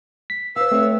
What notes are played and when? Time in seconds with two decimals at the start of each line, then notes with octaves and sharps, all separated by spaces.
0.30 B6
0.56 B4 C5 F5 E6
0.72 A3 C4 C#5